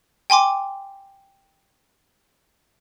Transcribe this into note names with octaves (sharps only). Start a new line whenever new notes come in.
G5 G#5 C6 D6